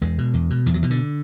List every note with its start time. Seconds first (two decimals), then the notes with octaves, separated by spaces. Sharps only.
0.02 E2 G#3
0.18 B2
0.34 E2
0.50 B2
0.66 E2 E3
0.74 F#3
0.83 B2 E3
0.90 D3